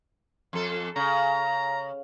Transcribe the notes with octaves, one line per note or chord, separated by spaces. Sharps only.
F2 A4
C#3 A#5